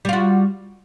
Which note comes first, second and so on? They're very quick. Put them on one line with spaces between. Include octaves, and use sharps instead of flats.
G3 F4 F#4